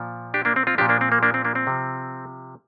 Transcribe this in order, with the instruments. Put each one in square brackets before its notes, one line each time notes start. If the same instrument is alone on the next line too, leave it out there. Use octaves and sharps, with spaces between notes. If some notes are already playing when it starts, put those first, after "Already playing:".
Already playing: [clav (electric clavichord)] A#2 F3
D4 G4
A#3 D4
C4
C4 F4
F3 D4 G4
A#2
A#3 D4
C4
A#3
A#3 D4
C4
A#3 D4
C4
C3 F3